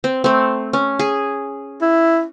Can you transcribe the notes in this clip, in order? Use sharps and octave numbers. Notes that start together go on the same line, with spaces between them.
C4
A3 C4
C#4
G#4
E4